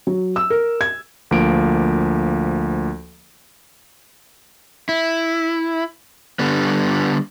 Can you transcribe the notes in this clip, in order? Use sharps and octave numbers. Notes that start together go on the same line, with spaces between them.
F#3
E6
A#4
G#6
D2 F3 A#3 D7
E4
D3 G3 B3